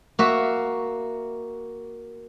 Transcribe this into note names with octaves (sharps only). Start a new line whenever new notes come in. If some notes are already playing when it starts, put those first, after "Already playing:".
A#3 F#4 E5